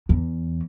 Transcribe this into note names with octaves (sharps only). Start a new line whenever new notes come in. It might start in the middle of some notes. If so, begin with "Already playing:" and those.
E2